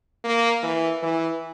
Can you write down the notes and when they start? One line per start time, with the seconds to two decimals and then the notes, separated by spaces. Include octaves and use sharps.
0.24 A#3
0.63 E3
1.03 E3